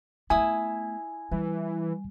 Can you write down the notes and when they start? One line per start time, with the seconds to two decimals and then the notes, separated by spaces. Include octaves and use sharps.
0.30 A3 B3 E4 G#5 D#6
1.31 E3 G3